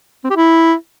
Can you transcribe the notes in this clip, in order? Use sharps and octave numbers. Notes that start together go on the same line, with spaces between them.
C4
G4
E4